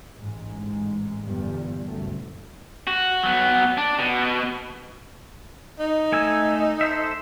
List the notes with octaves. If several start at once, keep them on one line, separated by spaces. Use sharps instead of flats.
A1 G#2 G#3
G1 E2 G2 A#2 G3
F#1 C2 A3
F#4
F#3 B3
D4
B2
D#4
A3 G#5 E6
A4 C5 E5